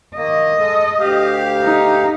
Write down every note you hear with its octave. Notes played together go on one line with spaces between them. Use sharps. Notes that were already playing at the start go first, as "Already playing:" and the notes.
D#3 A#3 D#5
G#3 A4
D2 G4 F5
D#4